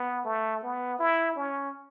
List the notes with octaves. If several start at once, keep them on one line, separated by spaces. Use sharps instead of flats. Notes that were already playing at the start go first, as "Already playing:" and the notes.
Already playing: B3
A3
B3
E4
C#4